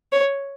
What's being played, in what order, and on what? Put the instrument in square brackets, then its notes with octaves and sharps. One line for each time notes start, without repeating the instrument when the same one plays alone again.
[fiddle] C#5